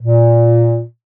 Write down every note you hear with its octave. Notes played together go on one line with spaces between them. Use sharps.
A#2